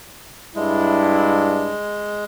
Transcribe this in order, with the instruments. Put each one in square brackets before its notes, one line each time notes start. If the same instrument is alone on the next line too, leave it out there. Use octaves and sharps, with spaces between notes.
[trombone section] G2 D4 E4 [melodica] G#3